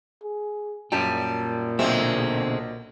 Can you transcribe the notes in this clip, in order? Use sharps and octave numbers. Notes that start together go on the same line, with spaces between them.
G#4
F#2 A#2 G3 G5 A5
B1 B2 D3 G#3 C4 E5